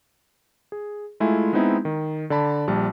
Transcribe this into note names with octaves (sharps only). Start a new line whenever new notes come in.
G#4
G#3 A3 E4 F4 G#5
G#3 B3 C4 D#4 E4
D#3
D3 D5 A5 B5
A#1 G3 A5